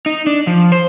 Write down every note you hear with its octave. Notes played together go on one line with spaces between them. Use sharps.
D#4
D4
F3
C5